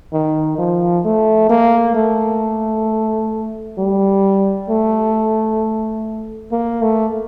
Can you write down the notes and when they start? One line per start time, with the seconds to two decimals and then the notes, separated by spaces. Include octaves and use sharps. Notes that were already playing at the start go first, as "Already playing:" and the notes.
0.13 D#3
0.58 F3
1.05 A3
1.49 A#3
1.95 A3
3.78 G3
4.69 A3
6.51 A#3
6.82 A3